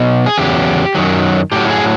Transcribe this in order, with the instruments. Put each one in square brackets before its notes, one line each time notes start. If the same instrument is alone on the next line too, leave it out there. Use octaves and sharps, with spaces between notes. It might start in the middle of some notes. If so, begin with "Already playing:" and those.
Already playing: [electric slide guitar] B2 F#3
G#4
E2 C#3 F#3 G4
F#2 D#3 F#3
A2 F#3 G4
G#4